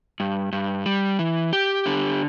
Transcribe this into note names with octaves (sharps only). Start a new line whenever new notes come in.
G2
G2
G3
E3
G4
D3